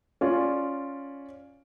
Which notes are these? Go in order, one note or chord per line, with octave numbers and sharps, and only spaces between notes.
C#4 F4 D5